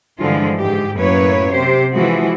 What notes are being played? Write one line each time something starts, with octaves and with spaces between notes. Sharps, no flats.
G2 D3 E3 F3 G#3 F4
G#2 G4
F#2 A2 A#3 E4 B4 C#5
C3 G4 C5
E3 F3 G#3 F#4